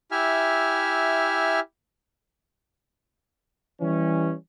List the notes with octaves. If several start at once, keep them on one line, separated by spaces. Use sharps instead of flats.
E4 G4 E5 G#5 F6
E3 G3 C#4